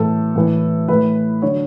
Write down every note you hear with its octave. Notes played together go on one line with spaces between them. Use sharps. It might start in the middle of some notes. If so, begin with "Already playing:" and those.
Already playing: A2 E3 A4
A2 E3
A2 E3 B4
D3 F#3 C#5